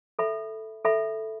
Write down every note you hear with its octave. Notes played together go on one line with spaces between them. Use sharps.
A4 E5 B5
A4 E5 B5